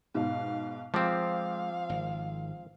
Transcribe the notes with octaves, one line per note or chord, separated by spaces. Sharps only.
G#2 B2 F5
F3 G#3 C4 F5 D6
G#1